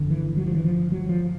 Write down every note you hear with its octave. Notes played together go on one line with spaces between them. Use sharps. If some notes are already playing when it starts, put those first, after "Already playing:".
Already playing: G1 F2 D3
E3
F#3
F3
E3
F3
F#3
F3